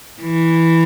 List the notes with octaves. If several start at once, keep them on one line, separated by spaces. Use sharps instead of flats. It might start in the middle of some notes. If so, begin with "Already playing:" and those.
E3